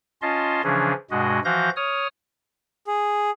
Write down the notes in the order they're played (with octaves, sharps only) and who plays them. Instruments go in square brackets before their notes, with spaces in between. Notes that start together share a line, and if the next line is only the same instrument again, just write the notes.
[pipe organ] C#4 F4 D#5 A5 C6
C#3 E3 F3 C#4 D4 G#4
G2 B2 G#3 F#4 D#5
E3 F3 F#4 F5 G6 A#6
C#5 D#6 F6
[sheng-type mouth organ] G#4